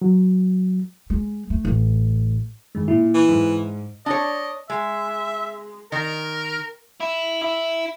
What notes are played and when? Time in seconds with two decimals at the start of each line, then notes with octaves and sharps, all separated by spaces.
0.02 F#3
1.10 G#3
1.50 A3
1.65 A1
2.75 G2 D#3 G#3
2.88 A#2 E4
3.14 E3
3.29 G#2
4.06 D4 C#5 D#5
4.70 G#3 E5
5.92 D#3 A#4
7.00 E4
7.42 E4